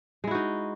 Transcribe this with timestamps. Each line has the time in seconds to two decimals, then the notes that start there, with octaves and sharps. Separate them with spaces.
0.24 G#3
0.27 E4
0.31 F#4
0.35 D#4